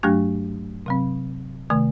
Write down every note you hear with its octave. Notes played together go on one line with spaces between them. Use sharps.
G2 F#3 A3 D4 G4
C3 F#3 C4
C3 D#3 A3